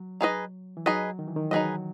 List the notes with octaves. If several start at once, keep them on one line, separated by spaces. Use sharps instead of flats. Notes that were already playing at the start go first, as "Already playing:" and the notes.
Already playing: F#3
D#4 G#4 B4 D#5
E3
F#3 D#4 G#4 B4 D#5
D#3
E3
D#3
F#3 D#4 G#4 B4 D#5